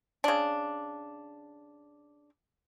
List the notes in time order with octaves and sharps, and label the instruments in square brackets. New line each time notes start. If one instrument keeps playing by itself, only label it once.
[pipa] C#3 D4